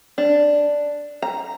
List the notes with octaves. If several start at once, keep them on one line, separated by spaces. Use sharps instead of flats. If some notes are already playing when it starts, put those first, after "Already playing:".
D4
A#5